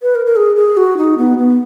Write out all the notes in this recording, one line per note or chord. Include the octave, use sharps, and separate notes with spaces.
B4
A#4
A#4
G#4
G#4
F#4
D#4
B3
B3